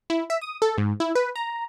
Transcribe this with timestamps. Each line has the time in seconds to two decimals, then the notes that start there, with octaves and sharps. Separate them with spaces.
0.10 E4
0.30 E5
0.41 D#6
0.62 A4
0.78 G#2
1.00 E4
1.15 B4
1.36 A#5